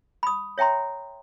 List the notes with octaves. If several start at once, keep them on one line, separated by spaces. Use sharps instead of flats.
B5 D#6
C#5 E5 G5 A#5 C6